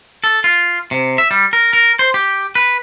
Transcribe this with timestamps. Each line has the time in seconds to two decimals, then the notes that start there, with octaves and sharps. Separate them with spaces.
0.24 A4
0.44 F4
0.91 C3
1.18 E5
1.31 G3
1.53 A#4
1.73 A#4
1.99 C5
2.14 G4
2.55 B4